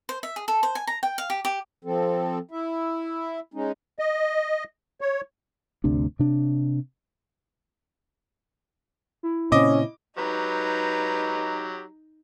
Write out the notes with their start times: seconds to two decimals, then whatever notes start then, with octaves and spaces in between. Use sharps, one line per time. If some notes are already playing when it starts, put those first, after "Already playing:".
0.09 C5
0.23 E5
0.36 G#4
0.48 A4
0.63 C5
0.75 G#5
0.87 A#5
1.03 G5
1.18 F5
1.30 G4
1.45 G4
1.84 F3 C4 A4
2.51 E4 E5
3.54 G#3 C#4 D#4
3.99 D#5
5.01 C#5
5.84 G1 D2 C3 D4
6.19 C3 D4
9.23 E4
9.52 A#2 C#3 C4 C#4 D#5 D6
10.18 F#3 D#4 G4 B4 A#5